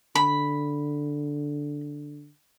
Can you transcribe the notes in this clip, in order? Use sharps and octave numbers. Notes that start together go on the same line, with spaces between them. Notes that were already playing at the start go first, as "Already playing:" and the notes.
D3 B5